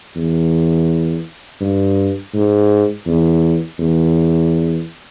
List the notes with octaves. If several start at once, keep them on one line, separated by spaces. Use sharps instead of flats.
E2
G2
G#2
E2
E2